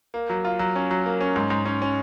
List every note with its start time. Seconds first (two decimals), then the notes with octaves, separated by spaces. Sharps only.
0.14 A#3
0.30 F#3
0.45 F4
0.59 F#3
0.75 C#4
0.91 F#3
1.06 A#3
1.20 C#4
1.36 G#2
1.50 G#2
1.65 C#4
1.82 C#4